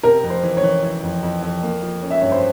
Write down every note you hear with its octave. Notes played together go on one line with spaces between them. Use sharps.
C3 A#4
F2
C5
E3
C#5
E3
E3
F2
F2
F2
A#3
F3
C#4
E5
G2 C#5
C5